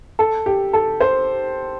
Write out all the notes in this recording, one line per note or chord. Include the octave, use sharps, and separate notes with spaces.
A4
G4
A4
C5